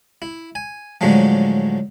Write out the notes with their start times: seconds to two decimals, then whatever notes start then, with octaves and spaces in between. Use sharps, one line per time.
0.22 E4
0.55 G#5
1.01 A2 D3 F3 F#3 G#3 A3